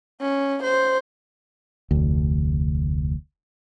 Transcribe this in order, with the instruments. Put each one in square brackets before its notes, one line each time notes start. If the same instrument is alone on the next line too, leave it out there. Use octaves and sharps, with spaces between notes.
[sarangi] C#4
C5
[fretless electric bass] F1 D2